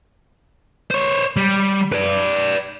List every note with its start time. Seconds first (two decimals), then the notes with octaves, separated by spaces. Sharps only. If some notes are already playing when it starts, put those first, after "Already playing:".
0.91 C5 C#5
1.36 G3
1.92 B4 D5